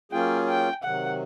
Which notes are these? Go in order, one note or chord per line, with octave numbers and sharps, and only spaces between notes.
F#3 A#3 C#4 F4 G#4 G5
G5
C3 D#3 F#3 F#5